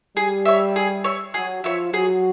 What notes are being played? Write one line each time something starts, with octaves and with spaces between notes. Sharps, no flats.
G3 G4 G#4
C#5 E5
G#4
C#5 E5
F#3 F#4 G#4
F3 F4 C#5 E5
F#3 F#4 G#4